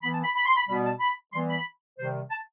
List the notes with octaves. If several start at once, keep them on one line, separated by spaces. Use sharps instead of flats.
E3 B3 B5
A5
B5
B5
C6
B5
B2 G3 B3 B5
A5
B5
E3 G3 B3 C6
B5
C3 D#3 G3 C5
A5